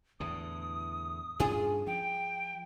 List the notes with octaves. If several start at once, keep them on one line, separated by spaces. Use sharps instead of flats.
E2 A2 D3 D#6
G2 C#4 D4 F4 G#4
F3 G5